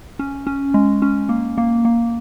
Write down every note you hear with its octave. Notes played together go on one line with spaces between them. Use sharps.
C#4
C#4
G#3
C#4
A#3
A#3
A#3